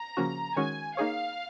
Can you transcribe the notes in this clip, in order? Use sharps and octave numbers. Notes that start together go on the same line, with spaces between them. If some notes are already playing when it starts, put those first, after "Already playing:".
Already playing: A#5
C#3 F3 A#3 C#4 F#4
D#3 G#3 C#4 F#4 C#5 G#5
A#3 D#4 G#4 C#5 F5